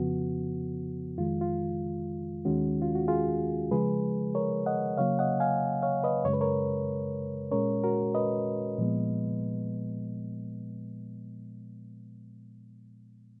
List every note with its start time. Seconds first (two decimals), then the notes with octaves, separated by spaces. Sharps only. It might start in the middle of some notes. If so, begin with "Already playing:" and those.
Already playing: F2 C#3 F3 B3 F#4
1.17 F2 D#3 G#3 F4
1.41 F4
2.45 D#2 D#3 G#3 C#4 F#4
2.82 F4
2.95 F#4
3.08 F4 G#4
3.71 C#3 F3 G#3 G#4 B4
4.35 A#4 C#5
4.66 D#5 F#5
4.98 C#3 F#3 A#3 C#5 F5
5.19 D#5 F#5
5.40 F5 G#5
5.82 C#5 F5
6.03 B4 D#5
6.25 F#2 C#3 G#3 C#5
6.33 B4
6.41 A#4 C#5
7.51 A#2 G#3 C#4 A#4 C#5
7.84 F#4 A#4
8.15 B4 D#5
8.79 A#2 F3 G#3 B3